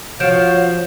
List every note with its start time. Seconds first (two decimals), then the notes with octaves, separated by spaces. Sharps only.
0.20 F3 F#4 C#5 F5 G6 D7 E7